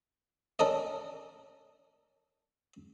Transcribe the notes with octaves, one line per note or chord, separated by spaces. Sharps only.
C#4 A4 A#4 D5 D#5